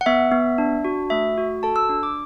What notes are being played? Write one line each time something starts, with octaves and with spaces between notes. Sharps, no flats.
F#5
B3 E5
B3
D4
F#4
A3 E5
F#4
A4 A5
E6
D4
D6